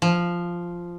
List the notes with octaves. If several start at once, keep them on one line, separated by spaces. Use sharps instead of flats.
F3